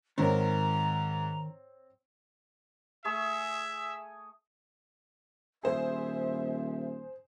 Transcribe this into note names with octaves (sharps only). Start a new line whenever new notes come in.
G#2 D#3 C4 A#4 C#5 A#5
A3 G#4 E5 C#6
D#1 G#4 C5 E5